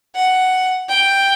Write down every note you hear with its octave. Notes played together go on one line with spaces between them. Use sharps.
F#5
G5